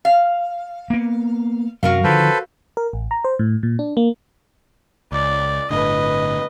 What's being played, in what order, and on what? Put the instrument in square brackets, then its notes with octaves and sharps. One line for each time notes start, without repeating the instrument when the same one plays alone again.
[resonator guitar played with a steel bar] F5
[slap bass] A#3 B3
[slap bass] F#2 C3 F#3 [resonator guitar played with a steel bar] F#4 A#4 F5
[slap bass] D3 D#3 F3 [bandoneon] A4 B4 C5
[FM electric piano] A#4
A1
A#5
C5
A2
A#2
D4
A#3
[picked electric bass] C#2 [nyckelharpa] D5
[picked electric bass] G1 A2 D3 [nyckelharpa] B4 D#5